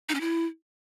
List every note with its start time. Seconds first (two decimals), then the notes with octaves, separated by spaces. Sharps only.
0.09 D#4
0.15 C#4
0.21 E4